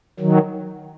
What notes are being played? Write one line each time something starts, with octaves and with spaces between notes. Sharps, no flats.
D#3 F#3